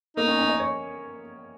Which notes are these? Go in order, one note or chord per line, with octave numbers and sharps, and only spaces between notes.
A#3 D#4
C#4
C#4
D#5
C#5